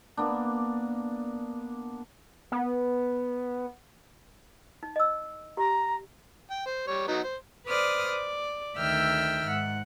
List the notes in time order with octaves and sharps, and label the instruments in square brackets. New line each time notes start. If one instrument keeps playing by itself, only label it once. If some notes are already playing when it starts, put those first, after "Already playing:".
[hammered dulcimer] A#3 B3 D4
[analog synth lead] B3
[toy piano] D#4
D#5 E6
[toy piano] G4 [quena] A#5
[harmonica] G5
C5
G3 C#5
F#3 B3 D#4
C5
[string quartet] B4 C5 D5 D#6 F6
D5
D2 D#3 E5 G5 E6 F6
G#2 F#5